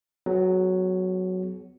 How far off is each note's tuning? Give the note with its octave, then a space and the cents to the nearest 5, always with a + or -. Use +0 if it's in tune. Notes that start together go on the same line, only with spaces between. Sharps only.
F#3 +0 B3 +35 G#4 +35